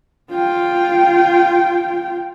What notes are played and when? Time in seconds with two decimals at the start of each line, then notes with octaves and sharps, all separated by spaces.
0.31 F4 G5